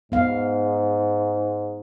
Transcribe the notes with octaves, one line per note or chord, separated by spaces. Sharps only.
G#2 B3 F5